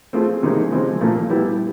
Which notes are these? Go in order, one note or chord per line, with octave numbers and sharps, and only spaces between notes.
A3 C4 F4 G#4
C3 D#3 G#3
C#3 F3 G#3 C4 F4
A#2 F3 A3
G3 B3 E4 G4